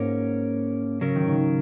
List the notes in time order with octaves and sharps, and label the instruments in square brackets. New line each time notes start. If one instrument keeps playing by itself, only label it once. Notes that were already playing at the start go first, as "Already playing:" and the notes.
Already playing: [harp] G#2 [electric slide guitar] A#3 C#4 A#4 C#5
[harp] C#3 [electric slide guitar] F#3 C#4 A#4
[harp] D#3
C#3